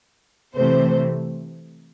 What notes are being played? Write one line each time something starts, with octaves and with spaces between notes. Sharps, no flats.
C3 E3 A3 C5